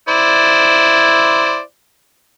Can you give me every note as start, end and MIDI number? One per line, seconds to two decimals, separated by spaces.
0.08 1.60 64
0.08 1.60 72
0.08 1.60 74